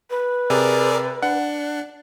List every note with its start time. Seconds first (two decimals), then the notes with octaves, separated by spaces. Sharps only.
0.10 B4
0.50 C3 G#4 A#4 D5
1.22 D4 F#5